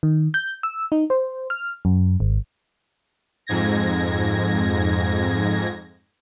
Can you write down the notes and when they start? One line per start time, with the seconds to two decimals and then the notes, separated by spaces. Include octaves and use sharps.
0.03 D#3
0.34 G6
0.63 E6
0.92 D#4
1.10 C5
1.50 F6
1.85 F#2
2.20 G#1
3.47 F2 G#2 G#6 A#6